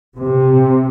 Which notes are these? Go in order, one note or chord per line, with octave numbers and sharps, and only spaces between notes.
C3